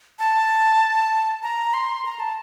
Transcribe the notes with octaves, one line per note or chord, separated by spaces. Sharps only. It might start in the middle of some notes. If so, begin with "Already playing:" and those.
A5
A#5
C6
A#5
A5